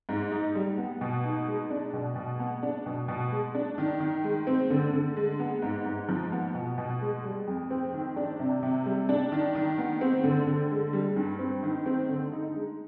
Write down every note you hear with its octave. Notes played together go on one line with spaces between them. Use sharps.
G#2
D#4
G3
B3
B2
D#4
G#3
D4
B2
B2
B3
D4
B2
B2
G#3
D4
D#3
D#3
G#3
C4
D3
D3
G#3
B3
G#2
G#2
F3
B3
B2
B2
G#3
G3
F2
C4
D#3
D4
C3
C3
G3
D4
D#3
D#3
B3
C4
D3
D3
G#3
G3
G2
C4
D#3
C4
D3
D#4
G#3